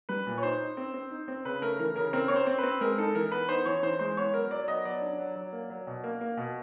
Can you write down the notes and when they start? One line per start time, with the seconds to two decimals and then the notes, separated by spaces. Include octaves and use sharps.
0.09 G3 B4
0.27 A#2
0.38 C#5
0.43 D#4 C5
0.60 D#4
0.77 C4
0.94 C4
1.11 D#4
1.28 C4
1.45 C#3 B4
1.62 A3 A#4
1.79 E3 A#4
1.96 C#3 A#4
2.13 C4 A#4
2.28 C4 C#5
2.36 C5
2.47 C4
2.58 C4 B4
2.81 G#3 A#4
2.98 D#4 A4
3.15 E3 A#4
3.32 B3 B4
3.49 D#4 C5
3.66 E3 C#5
3.83 E3 C5
3.99 G#3 C5
4.17 B3 C#5
4.34 F#3 A#4
4.51 F#3 D5
4.68 B3 D#5
4.85 F#3 D5
5.02 D4
5.18 F#3
5.36 F#3
5.52 A#3
5.70 F#3
5.87 B2
6.04 A#3
6.21 A#3
6.37 B2